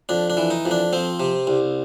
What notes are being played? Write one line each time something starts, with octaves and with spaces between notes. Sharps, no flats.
F2 D4
D4
E3
D#4
F2
D4
F3 C4
C3
C2